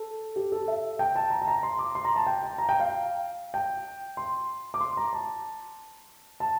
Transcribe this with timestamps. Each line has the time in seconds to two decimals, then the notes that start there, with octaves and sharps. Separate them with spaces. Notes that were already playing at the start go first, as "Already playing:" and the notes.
Already playing: A4
0.36 G4
0.52 A4
0.68 E5
0.99 G5
1.16 A5
1.30 A#5
1.42 A5
1.48 A#5
1.63 C6
1.79 D6
1.95 C6
2.05 A#5
2.16 A5
2.27 G5
2.43 A5
2.58 A#5
2.69 G5
2.80 F5
3.54 G5
4.17 C6
4.74 D6
4.81 C6
4.97 A#5
5.13 A5
6.40 A5